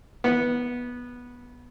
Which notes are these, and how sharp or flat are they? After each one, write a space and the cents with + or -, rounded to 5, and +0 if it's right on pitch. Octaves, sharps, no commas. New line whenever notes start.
B3 -15